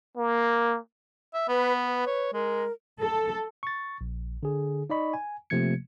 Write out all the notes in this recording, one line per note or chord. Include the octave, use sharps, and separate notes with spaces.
A#3
E5
B3 B4
B4
C#5
G#3 A#4
A4
C#6 A6
A#1
D3 G#4
D#4 D5 D#5 B5 C#6
G#5
C3 F3 A3 A#3 G#6 C#7